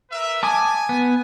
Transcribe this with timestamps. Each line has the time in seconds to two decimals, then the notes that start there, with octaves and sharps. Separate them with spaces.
0.11 A#4 B4 E5
0.43 G#5 A5 D6 D#6
0.89 B3